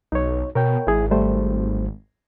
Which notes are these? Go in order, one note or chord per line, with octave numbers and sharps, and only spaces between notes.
B1 D#4 C#5
B2 A#4 C#5 G5
G#1 E4 G#4
G3 A3 C5